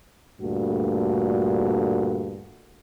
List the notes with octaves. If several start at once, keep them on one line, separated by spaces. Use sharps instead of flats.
D2 G2 A#2 A3 F#4